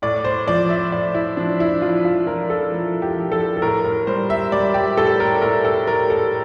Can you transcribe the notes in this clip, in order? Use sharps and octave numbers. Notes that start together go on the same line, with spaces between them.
A2 D5
C5
F3 D5
E5
A2 D5
E4
F3 D4
E4
F3 F4
F4
F3 A#4
A4
F3
G4
F3
A4
A4
A2 A#4
A#4
G3 C5
E5
G3 D5
G4
A2 A4
A#4
A2 A#4
A4
A2 A#4
A4